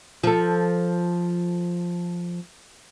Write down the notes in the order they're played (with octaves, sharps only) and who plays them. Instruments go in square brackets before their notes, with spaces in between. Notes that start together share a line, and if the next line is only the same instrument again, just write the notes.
[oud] F3 A4